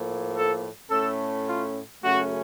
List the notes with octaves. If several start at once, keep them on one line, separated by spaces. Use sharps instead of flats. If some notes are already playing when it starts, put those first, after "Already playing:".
Already playing: A2 F3 A#3
A4
A2 A3 C#4 A4
F4
F#2 C#3 A3 C#4 F#4